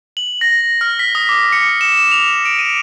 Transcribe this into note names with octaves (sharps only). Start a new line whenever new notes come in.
F#7
A#6
F6
B6
D#6
D6
C#7
E7
E7
F7
D7
D#7